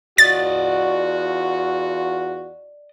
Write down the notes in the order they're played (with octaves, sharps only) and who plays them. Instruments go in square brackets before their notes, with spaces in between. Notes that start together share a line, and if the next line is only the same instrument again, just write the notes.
[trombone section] E2 F4 F#4 [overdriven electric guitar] D5 D#5 [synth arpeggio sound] A6